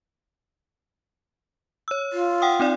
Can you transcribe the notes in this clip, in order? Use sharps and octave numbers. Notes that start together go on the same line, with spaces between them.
C#5 E6
F4
F#5 G5 D#6
C4 D#4 D5